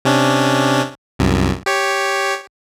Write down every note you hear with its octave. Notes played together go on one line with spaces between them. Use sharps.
C3 C#4 D4
C2 F#2
G4 C#5